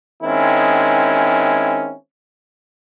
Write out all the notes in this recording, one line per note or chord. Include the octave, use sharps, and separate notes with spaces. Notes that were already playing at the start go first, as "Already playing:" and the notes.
D#3 G#3 C4 C#4 E4